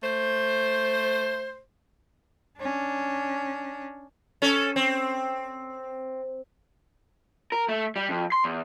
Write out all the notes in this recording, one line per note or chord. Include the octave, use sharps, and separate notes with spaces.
A3 C5
C#4 D4
C#4 A4
C4
A#4
A3
G3
F2
C6
E2